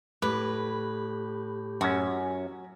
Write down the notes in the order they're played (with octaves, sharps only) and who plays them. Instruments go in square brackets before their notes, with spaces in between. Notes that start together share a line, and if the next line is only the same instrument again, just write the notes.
[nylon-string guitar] A2 [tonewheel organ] G4 [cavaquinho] B4
[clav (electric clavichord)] F#2 C#4 [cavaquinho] F#4